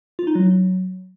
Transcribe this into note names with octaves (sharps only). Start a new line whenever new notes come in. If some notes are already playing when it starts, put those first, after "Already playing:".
F4
D#4
F#3